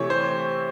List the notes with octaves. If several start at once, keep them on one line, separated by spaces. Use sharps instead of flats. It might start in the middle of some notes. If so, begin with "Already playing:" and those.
Already playing: C3 E3 A3 C#5
C5